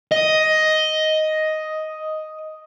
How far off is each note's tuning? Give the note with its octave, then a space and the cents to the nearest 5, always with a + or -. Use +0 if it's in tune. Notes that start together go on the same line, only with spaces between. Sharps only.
D#5 +5